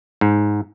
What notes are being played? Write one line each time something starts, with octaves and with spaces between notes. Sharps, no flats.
G#2